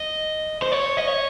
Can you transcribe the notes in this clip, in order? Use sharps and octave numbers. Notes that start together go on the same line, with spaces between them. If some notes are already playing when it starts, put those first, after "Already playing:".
Already playing: D#5
C5
C#5
D#5
C#5